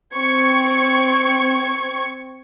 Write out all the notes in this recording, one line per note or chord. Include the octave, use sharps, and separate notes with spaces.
C4 C#6 G#6